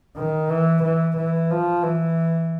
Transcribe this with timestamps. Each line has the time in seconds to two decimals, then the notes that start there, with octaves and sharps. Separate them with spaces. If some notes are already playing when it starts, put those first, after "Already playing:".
0.17 D#3
0.50 E3
0.83 E3
1.16 E3
1.51 F3
1.83 E3